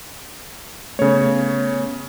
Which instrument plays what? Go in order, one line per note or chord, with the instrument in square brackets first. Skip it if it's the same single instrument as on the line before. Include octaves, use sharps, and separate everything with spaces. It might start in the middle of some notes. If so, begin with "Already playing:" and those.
[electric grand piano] C#3 C#5 [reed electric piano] A3 B3 C#4